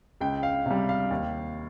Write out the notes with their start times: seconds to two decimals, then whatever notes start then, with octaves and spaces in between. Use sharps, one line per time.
0.21 C#2 G5
0.43 F5
0.66 C3 G3
0.89 F5
1.11 D#2